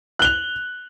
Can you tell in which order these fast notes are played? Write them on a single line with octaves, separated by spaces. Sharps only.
F#6 G7 F7